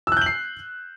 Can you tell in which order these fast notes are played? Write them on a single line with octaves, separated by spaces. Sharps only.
E6 F#6 G6 F#7 C7